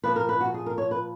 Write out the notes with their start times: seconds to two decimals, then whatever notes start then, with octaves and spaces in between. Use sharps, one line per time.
0.04 A#2 F3 B4
0.16 A#4
0.29 B4
0.41 F#4
0.54 G#4
0.66 A#4
0.78 C#5
0.91 B4